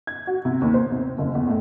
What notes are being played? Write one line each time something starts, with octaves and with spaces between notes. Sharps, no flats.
G#6
F#4
C3
D#2
C5
C3
F#1
E2
A2